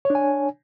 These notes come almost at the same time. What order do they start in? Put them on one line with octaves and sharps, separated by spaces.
C#5 D4 G#5